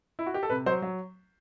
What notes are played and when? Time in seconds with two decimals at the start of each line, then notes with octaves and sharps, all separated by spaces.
0.19 E4
0.26 F#4
0.34 G4
0.43 A4
0.50 C3 B4
0.66 F#3 C5
0.82 F#3